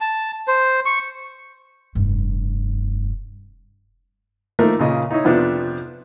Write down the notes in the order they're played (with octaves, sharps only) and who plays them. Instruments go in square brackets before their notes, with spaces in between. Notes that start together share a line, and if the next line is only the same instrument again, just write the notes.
[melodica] A5
C5
C#6
[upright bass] F1 G2
[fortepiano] F3 A3 A#3 D#4 A#4
A#2 C#3 D#5
D#4 E4 C#5 D#5
F2 C3 F3 B3 D4